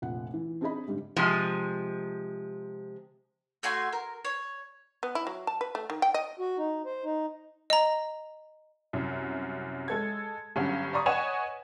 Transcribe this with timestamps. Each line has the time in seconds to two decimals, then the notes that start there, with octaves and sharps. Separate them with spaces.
0.02 F1 A#1 F#5
0.34 E3
0.61 C4 D4 D#4 G#4 D#5 B5
0.87 G#2 D3 G3 G#3 G4
1.16 C3 F3 G#3
3.63 A3 F#4 G#5 C6
3.93 A#4
4.25 C#5
5.03 B3
5.15 E4
5.27 F#3
5.47 A5
5.61 B4
5.75 A3
5.90 D#3
6.02 G5
6.14 D#5
6.39 F#4
6.58 D#4
6.86 C5
7.05 D#4
7.70 D#5 A#5
8.93 C2 F#2
9.88 G#3 A4 G#6
10.56 G1 G2 F#3 C#4
10.93 D5 A#5 B5 C#6 D#6
11.06 B4 C#5 D#5 F#5 G#5 E7